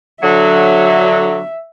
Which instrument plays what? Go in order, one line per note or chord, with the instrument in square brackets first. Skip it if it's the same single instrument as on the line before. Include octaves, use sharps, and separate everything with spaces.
[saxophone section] D3 F#3 [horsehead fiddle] E5